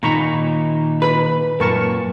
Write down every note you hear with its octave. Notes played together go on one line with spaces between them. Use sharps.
A#2 D#3 D#4 A#5 B5 C#6
B4 B5
F#2 A#2 A#4 A5 C#6